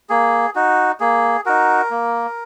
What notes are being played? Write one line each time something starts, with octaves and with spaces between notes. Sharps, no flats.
A#3 G#4
D#4 F#4
A#3 G#4
D#4 F#4 A#4
A#3